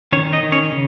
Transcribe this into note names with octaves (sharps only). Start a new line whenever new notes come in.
D#3 C#4 C#5
D#4 D#5
D#3
C#4 C#5
C#3